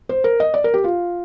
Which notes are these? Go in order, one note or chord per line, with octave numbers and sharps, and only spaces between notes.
C5
A#4
D#5
D5
A#4
G4
F4